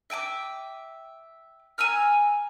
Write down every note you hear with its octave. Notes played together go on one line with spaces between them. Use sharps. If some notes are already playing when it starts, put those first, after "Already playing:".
E5 G5 G#5 D6
G#5 A#5 E6 F6